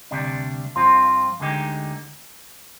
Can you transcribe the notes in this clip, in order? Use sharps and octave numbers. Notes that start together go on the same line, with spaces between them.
D2 C3 G3 D4
G2 F3 C4 F4 C6
D2 D3 G#3 D#4 G4